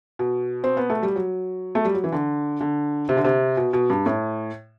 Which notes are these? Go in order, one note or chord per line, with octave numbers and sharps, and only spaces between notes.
B2
C4
B3
A3
G3
F#3
A3
G3
F#3
E3
D3
D3
C3
D3
C3
B2
B2
G2
A2